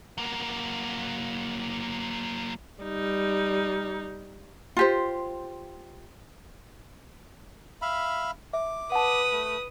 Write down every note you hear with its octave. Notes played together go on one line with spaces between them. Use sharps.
F#3 A#3
G3 D#4
F4 G4 C5
E5 F5 B5
E5 D6
B4 F#5 A5 D#6
A3